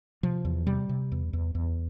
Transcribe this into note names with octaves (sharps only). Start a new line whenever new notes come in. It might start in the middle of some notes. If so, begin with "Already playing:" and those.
C3 F3
E2
C3 G3
C3
E2
E2
E2